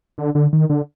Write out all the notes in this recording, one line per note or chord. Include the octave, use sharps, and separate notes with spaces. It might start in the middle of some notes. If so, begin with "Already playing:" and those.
D3
D3
D#3
D3